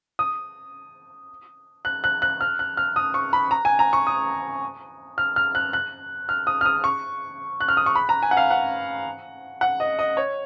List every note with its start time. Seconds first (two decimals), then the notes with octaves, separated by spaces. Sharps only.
0.19 D#6
1.85 F#6
2.04 F#6
2.22 F#6
2.41 F6
2.59 F#6
2.77 F6
2.96 D#6
3.14 C#6
3.33 B5
3.51 A#5
3.65 G#5
3.79 A#5
3.93 C#6
4.07 D#6
5.18 F6
5.36 F6
5.55 F#6
5.73 F#6
6.29 F6
6.47 D#6
6.61 F6
6.65 D#6
6.84 C#6
7.60 F#6
7.68 F6
7.77 D#6
7.86 C#6
7.95 B5
8.09 A#5
8.23 G#5
8.31 F#5
8.37 F5
8.51 F#5
9.61 F#5
9.80 D#5
9.99 D#5
10.17 C#5